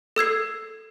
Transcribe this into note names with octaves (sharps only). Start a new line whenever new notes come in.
A4 E6 G#6 C7